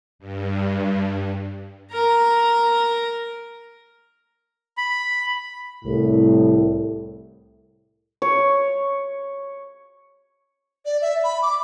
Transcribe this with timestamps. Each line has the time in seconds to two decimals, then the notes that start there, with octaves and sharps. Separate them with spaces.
0.19 G2
1.92 A#4 A#5
4.77 B5
5.85 C2 A2
8.22 C#5
10.86 D5
11.02 E5
11.24 B5
11.42 D6